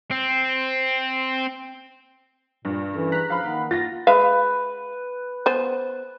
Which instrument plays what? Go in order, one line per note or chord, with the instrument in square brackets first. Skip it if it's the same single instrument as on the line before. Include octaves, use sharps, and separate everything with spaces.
[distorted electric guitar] C4
[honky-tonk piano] G2 [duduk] A#2 [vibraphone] D4
[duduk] E3 [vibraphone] C#4 A4 A#4
[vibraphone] D4 G#4 B4 [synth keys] A#5 F#6 B6
[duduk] F3 [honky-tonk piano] F5 B5
[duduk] D#3 [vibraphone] A#3 D#4 F#5
[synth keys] F4 [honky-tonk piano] A6 A#6
[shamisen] G#3 E5 F5 [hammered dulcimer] B4
[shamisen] B3 C5 G#5